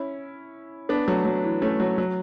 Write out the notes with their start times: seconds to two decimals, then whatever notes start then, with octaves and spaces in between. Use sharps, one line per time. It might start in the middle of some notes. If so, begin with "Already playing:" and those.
Already playing: C#4 E4
0.89 B3 D4
1.08 F#3 A3
1.25 F#3
1.44 E3
1.62 A3 C#4
1.80 F#3
1.98 F#3